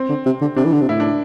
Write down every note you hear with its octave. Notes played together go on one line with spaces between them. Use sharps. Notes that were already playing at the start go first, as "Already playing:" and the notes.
Already playing: C4
D3
C3
D3
C3 D4
E3
D3
C3
A2 E4
D4